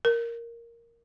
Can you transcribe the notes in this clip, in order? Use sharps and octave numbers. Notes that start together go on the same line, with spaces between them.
A#4